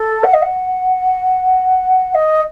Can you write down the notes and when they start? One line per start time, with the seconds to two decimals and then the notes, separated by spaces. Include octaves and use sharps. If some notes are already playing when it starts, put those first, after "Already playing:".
Already playing: A4
0.23 F#5
0.33 D#5
0.42 F#5
2.14 D#5